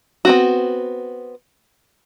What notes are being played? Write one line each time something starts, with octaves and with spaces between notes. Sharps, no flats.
B3 C4 F#4